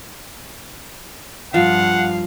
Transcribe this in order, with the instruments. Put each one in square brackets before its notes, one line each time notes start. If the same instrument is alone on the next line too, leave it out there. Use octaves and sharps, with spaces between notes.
[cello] G2 F5 [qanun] F3 [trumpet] F#5